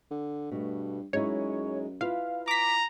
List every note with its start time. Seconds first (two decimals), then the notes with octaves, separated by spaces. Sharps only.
0.11 D3
0.51 G2 B2 A3
1.13 F#2 G#3 D#4 E4 C#5
2.01 E4 F4 B4 F5
2.48 A#5 D6 B6